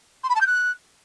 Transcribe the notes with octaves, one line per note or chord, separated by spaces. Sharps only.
C6
B5
A5
G6
F#6